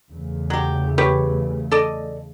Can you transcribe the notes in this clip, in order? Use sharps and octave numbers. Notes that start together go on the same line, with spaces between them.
E2 C#3 A3
F#3 G4
G4 B4 C#5
A4 D5 D#5